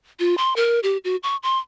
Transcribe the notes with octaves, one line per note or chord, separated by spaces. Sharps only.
F4
C6
A#4
G4
F#4
C#6
C6